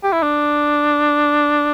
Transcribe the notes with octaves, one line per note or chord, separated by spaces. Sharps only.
G4
E4
D4